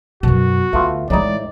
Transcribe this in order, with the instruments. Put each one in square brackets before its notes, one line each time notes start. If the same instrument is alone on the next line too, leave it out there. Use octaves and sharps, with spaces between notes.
[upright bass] F#2 B2 [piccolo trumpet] F#4 [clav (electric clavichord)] A5
[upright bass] D2 [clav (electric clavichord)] A3 B3 F4
[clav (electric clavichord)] A2 D#4 [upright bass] E3 G#3 [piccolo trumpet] D5